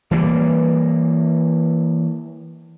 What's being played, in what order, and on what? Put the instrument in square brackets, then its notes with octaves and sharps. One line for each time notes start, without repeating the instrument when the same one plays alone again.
[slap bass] E3 G3 A#3